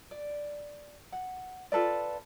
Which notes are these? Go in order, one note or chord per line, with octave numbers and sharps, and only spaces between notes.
D5
F#5
F4 A4 B4 D5